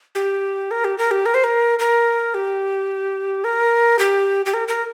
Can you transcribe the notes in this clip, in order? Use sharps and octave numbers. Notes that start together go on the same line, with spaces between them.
G4
A#4
G4
A#4
G4
A#4
C5
A#4
A#4
G4
A#4
G4
G4
A#4
A#4